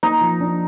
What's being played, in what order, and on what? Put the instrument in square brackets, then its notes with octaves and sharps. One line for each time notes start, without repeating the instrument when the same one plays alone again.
[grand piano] A#3 [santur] D#4
[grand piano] F3
D4